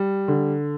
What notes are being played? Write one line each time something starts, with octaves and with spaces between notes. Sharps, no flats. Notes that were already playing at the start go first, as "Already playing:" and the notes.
Already playing: G3
D3